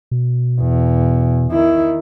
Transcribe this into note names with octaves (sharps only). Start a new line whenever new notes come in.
B2
E2
D#3 E4